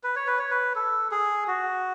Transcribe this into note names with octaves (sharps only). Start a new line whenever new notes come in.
B4
C#5
B4
C#5
B4
A4
G#4
F#4